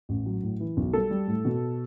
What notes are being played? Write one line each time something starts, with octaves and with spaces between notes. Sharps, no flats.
A1
F#3
A2
E3
B1
G3 A4
G3
A2
B2